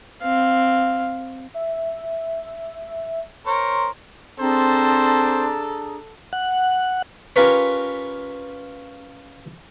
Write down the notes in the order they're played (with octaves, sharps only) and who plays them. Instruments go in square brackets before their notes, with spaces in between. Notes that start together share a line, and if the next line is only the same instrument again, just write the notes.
[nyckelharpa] C4 F5
[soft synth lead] E5
[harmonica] A#4 C5 C#5
[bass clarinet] C4 [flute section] D4 G#4 A#5 [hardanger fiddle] A4 [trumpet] C5
[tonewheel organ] F#5
[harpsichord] C#4 F4 G4 A#4 B4 C#5